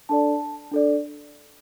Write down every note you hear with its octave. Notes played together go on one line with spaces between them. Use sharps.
D4 A4 D5 A5
D4 A4 D5